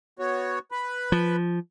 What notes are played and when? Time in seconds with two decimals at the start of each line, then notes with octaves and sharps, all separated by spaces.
0.19 B3 F#4 C#5
0.72 B4 B5
1.12 F3